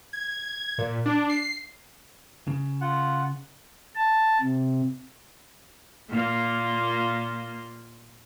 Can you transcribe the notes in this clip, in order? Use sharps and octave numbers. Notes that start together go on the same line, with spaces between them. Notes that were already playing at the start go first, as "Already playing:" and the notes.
G#6
A#2
D4
C7
C#3
F4 F#5
A5
C3
A#2 A#3 F4